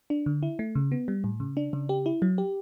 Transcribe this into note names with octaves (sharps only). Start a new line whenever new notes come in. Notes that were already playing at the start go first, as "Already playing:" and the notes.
D4
D3
E4
A3
C#3
B3
G3
A2
C#3
D4
C#3
G4
E4
F#3
G4